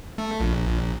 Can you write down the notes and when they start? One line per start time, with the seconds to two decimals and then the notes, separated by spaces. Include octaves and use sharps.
0.18 A3
0.40 A#1